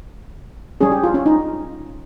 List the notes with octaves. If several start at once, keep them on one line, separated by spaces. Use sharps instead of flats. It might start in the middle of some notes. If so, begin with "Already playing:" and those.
G3 C#4 G#4
G4
F4
C#4
D#4